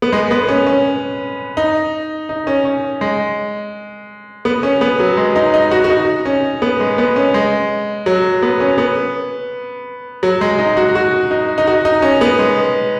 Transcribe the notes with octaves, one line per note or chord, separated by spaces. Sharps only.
B3
G#3
B3
B3
C#4
C#4
D#4
D#4
C#4
C#4
G#3
B3
C#4
B3
F#3
G#3
D#4
D#4
F#4
F#4
D#4
C#4
B3
G#3
B3
C#4
G#3
F#3
B3
C#4
B3
F#3
G#3
D#4
F#4
F#4
D#4
D#4
F#4
D#4
C#4
B3
G#3